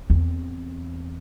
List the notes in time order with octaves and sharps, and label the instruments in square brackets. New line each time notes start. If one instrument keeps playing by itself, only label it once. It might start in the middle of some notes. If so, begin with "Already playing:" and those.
[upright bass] E2 C4